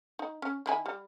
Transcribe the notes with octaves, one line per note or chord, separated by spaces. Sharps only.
D#4
C#4
D#3 E4 G#5
G3